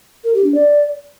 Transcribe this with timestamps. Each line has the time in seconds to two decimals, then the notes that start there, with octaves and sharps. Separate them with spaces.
0.24 A#4
0.34 G4
0.44 D4
0.54 D5